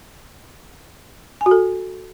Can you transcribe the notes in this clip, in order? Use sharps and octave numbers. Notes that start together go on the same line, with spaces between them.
G#5
F#4
A4